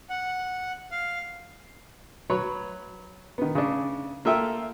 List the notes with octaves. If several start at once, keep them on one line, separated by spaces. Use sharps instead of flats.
F#5
F5
F#3 B4 C#5
D#3 B3
C#3 D4
A#3 F4 A4 E5 G5